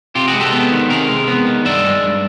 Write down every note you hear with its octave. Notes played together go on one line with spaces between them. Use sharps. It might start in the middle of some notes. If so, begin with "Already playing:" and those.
C3 F4 G4
F#4 G#4
G#3
G4 A4
B3
D#3
C3 G#4 A#4
G#3
B3
D#3
G2 D5 E5
G#3
G2